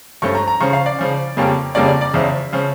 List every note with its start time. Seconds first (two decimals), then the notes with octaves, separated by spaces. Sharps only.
0.22 G2 F3 A3 C#4 C#6
0.35 A#5
0.48 A#5
0.60 C#3 F3 C#4 C#6
0.73 F5
0.86 D5
0.99 C#3 F3 C#4
1.37 F2 C#3 G3 A#3 C#4
1.75 F2 C#3 G3 A#3 C#4 D5
1.88 D5
2.01 D5
2.13 E2 C#3 F3 C#4 E5
2.52 C#3 F3 C#4